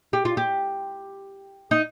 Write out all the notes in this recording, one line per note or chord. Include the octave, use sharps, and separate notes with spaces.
G4
F4
G4
D#4